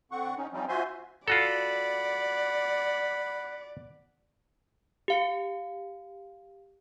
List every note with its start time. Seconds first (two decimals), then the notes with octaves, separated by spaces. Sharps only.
0.11 D3 C4 F#5 C#6
0.37 C#4 D#4
0.53 F3 G3 C4 C#4 D#4
0.68 F4 F#4 C5 E5 G#5 C6
1.28 F4 F#4 A4 D5 F#5 B5
5.08 G4 F5 C#7